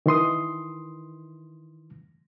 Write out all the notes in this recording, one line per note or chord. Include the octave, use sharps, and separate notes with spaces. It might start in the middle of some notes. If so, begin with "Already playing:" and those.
D#3 E3 C6 D#6